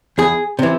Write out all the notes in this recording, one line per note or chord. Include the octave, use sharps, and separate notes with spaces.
E2 G#4
C3 E3